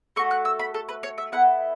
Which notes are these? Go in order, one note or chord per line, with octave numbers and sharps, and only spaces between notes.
A3 F#4 A4 C#6
F#6
E6
B5
A4
B4
C#5
E5
B3 E4 A4 F#5